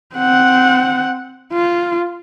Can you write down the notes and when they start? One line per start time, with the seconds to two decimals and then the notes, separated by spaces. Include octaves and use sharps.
0.16 C4 F#5
1.52 F4